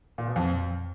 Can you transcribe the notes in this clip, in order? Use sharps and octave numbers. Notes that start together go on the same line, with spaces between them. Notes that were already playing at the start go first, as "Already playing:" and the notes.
A#2
B2
F2